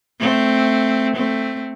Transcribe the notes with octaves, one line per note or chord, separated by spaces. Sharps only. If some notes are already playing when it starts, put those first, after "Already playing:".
A3 C4
A3 C4